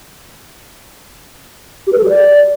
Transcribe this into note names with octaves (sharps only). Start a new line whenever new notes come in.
G4
B4
A4
G4
D5